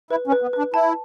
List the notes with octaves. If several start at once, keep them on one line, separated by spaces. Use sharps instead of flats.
E4 B4
C#4
B4
B3
D4 B4
E4 A5